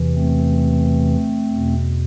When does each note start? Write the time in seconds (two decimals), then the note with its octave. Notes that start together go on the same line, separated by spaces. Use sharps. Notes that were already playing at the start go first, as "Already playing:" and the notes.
Already playing: E2 C3 E3
0.16 A3 C4
1.52 E2 B2